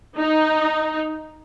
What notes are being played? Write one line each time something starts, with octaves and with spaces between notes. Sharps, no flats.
D#4